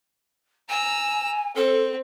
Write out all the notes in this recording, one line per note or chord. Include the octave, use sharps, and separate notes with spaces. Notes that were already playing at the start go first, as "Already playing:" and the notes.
G#5 A#5 E6
C4 A4